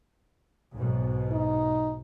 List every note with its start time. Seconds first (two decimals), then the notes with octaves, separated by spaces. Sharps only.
0.74 B1 G#2 B2
1.32 D#4